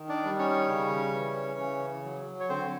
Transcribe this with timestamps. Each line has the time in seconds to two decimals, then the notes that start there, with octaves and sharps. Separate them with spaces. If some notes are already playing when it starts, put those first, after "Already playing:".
Already playing: D#3
0.09 D4 D5
0.25 G3
0.39 C#4 C#5
0.69 C#3
1.14 E3
1.59 C#3
2.05 F#3
2.40 C#5
2.49 D3 C4 C5